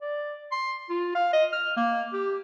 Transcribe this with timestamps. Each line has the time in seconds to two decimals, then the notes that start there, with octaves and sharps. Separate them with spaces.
0.01 D5
0.52 C6
0.89 F4
1.15 F5
1.33 D#5
1.52 F6
1.76 A#3
2.13 G4